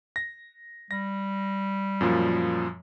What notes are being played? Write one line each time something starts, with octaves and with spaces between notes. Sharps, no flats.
A#6
G3 A#6
F#2 A#2 F3